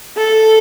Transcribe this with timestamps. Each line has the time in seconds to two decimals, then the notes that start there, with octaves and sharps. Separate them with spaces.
0.17 A4